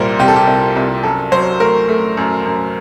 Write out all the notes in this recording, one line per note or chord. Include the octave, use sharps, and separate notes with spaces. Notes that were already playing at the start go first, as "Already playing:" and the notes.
Already playing: C2 A#2 G3 A#4 C5
C2 G4
A4
G4
C2
C2
F#2 A4
F#3 C5
A3 A#4
A3
F#2
F#2